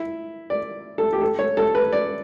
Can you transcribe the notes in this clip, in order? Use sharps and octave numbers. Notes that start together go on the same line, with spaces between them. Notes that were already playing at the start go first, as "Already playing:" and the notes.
Already playing: E4
D5
A4
G4
A4
C#5
A4
B4
D5